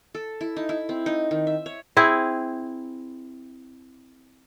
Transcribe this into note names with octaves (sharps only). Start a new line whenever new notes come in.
A4
E4
D#4
E4
C4
D#4
D#3
E5
C#5
C4 E4 G#4